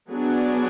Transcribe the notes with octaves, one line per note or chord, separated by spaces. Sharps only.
F#3 B3 D4 G#4